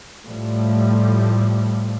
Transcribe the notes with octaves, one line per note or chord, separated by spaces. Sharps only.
A2 F3 G3